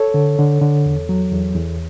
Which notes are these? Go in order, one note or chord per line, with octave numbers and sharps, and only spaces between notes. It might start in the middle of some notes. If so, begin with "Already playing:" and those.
Already playing: A4 C#5
D3
D3
D3
E2
F#3
E2
E2